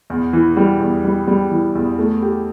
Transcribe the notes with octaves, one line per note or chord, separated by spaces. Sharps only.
E2
E3
G3
E2
G3
G3
E3
E2
A3
G4